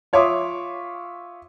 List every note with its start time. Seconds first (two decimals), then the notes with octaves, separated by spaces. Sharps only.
0.13 F4 C#5 E5 C6 D6 D#6